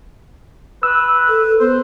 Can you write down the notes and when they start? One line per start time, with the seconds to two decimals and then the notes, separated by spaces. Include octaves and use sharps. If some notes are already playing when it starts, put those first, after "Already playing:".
0.83 B4 E6
1.28 A4
1.60 B3 C5